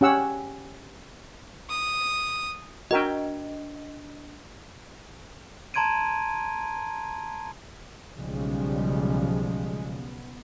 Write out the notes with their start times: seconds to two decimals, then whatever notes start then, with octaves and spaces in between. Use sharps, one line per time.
0.01 C#4 G4 F#5 E6
1.69 D#6
2.91 D4 F#4 A#4 D#5 G5
5.74 A5 A#5 C6 G#6 D7 D#7
8.17 B1 C#3 F3 G3 G#3
9.97 B3